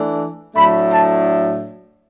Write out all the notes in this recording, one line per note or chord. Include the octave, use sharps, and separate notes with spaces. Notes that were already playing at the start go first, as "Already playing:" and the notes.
Already playing: E3 A3 D4
A2 F#3 A3 D4 B5
A5